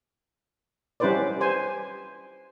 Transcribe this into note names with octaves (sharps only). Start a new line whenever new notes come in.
G3 C#4 E4 B4 C5 D5
C5 G#5